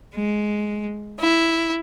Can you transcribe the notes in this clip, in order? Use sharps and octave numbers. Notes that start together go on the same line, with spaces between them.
G#3
E4